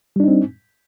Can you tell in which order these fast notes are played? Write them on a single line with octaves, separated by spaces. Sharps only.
G3 D4 D#4 C4